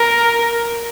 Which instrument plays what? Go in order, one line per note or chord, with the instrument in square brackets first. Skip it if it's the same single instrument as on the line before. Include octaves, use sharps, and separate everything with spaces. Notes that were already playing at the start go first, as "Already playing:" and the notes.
Already playing: [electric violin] A#4